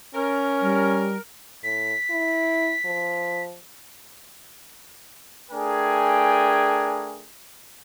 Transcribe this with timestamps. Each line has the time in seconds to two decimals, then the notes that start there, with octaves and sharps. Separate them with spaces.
0.15 C#4 A#4
0.61 G3
1.63 A2 B6
2.10 E4
2.85 F3
5.52 A3 D4 G#4 A#4 G5 G#5